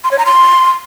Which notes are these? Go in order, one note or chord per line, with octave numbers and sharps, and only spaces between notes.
C6
C#5
A#5
C6